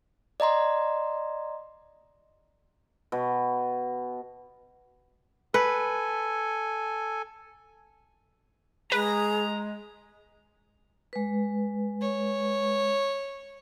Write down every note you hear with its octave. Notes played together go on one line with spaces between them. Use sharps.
D5 D#5 A#5 C6
B2
A4 B4 G#5
G#3 G#4 B4 A#5
G#3 B4
C#5